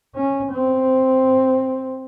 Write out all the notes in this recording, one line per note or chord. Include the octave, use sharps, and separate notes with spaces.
C#4
C4